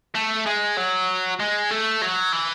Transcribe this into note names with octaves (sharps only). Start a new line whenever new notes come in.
A3
G#3
F#3
G#3
A3
F#3
E3